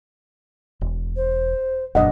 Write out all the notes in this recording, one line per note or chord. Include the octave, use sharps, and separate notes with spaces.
E1
C5
E1 F#2 A#2 D4 D#5 F#5